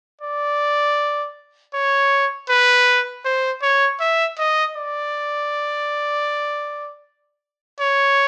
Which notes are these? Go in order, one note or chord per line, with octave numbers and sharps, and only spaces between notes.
D5
C#5
B4
C5
C#5
E5
D#5
D5
C#5